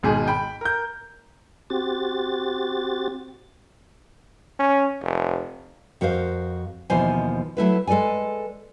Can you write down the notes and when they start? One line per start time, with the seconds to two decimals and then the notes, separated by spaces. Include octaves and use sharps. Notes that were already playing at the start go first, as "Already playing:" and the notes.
0.03 G#1 G#2 B2 G#4
0.28 G5 B5
0.61 A#4 G6
1.70 C4 F#4 G4 A6
4.60 C#4
5.02 F1
6.01 F2 F#4 A#4 C5 F5
6.90 D#2 B2 E3 F3 C5 G#5
7.57 F#3 A3 E4 B4
7.87 G#3 A4 B4 D5 G#5